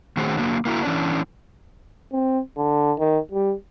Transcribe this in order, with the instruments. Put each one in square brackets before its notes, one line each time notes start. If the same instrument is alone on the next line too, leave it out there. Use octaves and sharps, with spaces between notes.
[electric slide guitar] D#3 A3 C#4 F#4 G#4 C5
D3 F#3 A#3
A#3 E4 F#4 A#4
E3 C#4 D4
[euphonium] C4
D3
D#3
G3